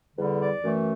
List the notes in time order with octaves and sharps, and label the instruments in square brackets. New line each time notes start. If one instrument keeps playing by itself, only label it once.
[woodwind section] E2 D3 G3
D5
F#2 E3 A3